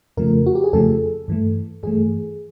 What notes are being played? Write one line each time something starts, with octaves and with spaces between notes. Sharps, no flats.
F2 C#3 F3 A3 A#4
F#4
G4
G#4
F2 C#3 F3 A3 A4
G2 E3 A3
G2 E3 A3 G#4